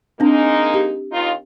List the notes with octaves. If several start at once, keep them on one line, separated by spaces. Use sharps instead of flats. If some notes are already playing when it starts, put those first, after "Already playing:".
G#3 A#3 C4 D4 D#4
G4
D#2 D#4 F4